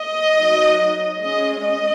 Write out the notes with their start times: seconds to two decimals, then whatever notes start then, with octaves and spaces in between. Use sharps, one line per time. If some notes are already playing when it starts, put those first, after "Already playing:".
Already playing: D#5
0.35 F#3 D#4
1.20 G#3 C#4 D#5
1.62 D#5